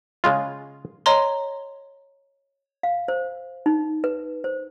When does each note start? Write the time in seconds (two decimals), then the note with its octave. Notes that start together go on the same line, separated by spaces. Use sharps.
0.24 C#3 G#3 F4
1.06 C#5 D#5 A#5 C6
2.83 F5
3.08 C5
3.66 D#4
4.04 B4
4.44 C5